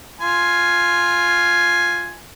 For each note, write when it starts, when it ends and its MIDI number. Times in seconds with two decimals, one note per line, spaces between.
0.21 2.16 65
0.21 2.16 80
0.21 2.16 84